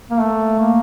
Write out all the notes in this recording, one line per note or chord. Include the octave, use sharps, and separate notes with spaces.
A#3
A3
A#3